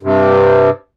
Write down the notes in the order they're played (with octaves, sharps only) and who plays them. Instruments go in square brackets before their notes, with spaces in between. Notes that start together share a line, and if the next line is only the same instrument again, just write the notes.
[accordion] G2 C3